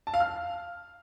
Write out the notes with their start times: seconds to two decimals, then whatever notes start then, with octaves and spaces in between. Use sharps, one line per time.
0.07 A5
0.14 F5
0.20 F6